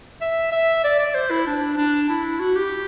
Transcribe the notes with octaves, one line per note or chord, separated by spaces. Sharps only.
E5
E5
D5
D5
C5
E4
D4
D4
E4
F#4
G4